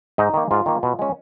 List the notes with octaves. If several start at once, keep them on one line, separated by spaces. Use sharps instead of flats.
G#2 D#4 D#5
D#3 A#3
G#2 F4
D#3 A#3
B2
G#3 C#4